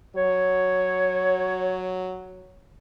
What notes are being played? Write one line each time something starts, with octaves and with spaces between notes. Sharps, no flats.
F#3 C#5